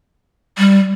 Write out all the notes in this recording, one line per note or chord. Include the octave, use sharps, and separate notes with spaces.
G3